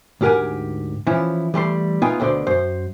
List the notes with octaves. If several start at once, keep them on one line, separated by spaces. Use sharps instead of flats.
D2 G#2 G4 A#4 F#5 G#5
E3 F3 C#4 E4
E3 G3 A3 C6
A3 B3 D#4 F4 G5 G#5
D2 B2 D3 C5 D5
F#2 C5